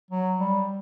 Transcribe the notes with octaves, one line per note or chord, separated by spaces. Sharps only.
F#3
G3